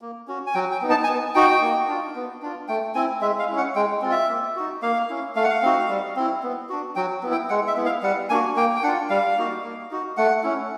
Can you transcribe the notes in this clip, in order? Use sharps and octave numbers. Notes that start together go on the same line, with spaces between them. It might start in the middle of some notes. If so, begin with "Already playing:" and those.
A#3
C#4 F#4
G#5
F#3 G5
G5
B3 D#4
A5
G#5
B3 A5
D#4 F#4 G5
A#3
D4 F4
B3
D4 F4
A3 G5
C4 E4 G#5
G#3 E5
F5
C#4 E4
F#5
G#3 G5
C4 F4
E5
A#3
D#4 F#4
A#3 F5
C#4 E4
A3 F5
F#5
F5
C4 D#4 F#4
G3
C4 E4
B3
D4 F#4
F#3 G5
B3 E4
G5
G#3 F#5
E5
B3 E4
F5
G3 F#5
A#3 D4 F#4 G#5
A#3 G5
G5
D4 F4 F#5
G3 F5
A#3 D#4 F#4
A#3
D#4 F#4
A3 F#5
C#4 E4